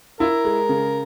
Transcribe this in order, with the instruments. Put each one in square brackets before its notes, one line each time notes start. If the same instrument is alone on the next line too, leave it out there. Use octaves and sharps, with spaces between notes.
[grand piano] E4 [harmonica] F4 A#4
[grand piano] G#3
C#3